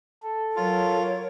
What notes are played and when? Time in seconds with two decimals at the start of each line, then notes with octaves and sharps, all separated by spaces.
0.23 A4
0.56 F#3 F4 A#4 C#5